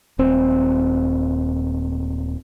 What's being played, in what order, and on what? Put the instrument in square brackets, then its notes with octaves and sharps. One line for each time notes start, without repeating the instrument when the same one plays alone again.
[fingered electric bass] D#1 C4